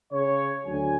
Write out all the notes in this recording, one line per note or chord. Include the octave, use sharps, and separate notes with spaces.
C#3 C#5
D2 F#3 G#5